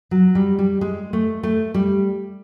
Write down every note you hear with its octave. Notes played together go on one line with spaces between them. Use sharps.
F#3
G3
G3
G#3
A3
A3
G3